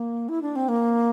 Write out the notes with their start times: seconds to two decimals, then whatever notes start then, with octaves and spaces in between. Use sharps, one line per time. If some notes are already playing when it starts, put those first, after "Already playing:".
Already playing: A#3
0.29 E4
0.42 D4
0.56 C4
0.68 A#3